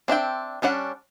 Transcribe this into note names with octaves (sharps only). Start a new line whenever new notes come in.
C4 D4 E5 G5
G3 C#4 D4 F#5